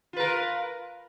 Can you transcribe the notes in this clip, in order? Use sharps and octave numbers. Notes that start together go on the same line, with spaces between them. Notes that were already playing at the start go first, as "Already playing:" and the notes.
F4 A#4 B4